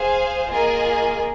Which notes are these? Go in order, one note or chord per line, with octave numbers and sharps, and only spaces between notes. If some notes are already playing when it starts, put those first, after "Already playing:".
Already playing: G#4 C5 F5 G#5
A#3 F4 G#4 D#5 G#5